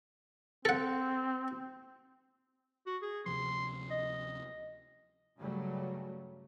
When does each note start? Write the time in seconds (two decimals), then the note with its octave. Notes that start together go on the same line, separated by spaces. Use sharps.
0.65 C4 A4 F#5
2.87 F#4
3.02 G#4
3.26 D2 C3 F3 C6
3.91 D#5
5.38 G2 C#3 F#3 G3 A3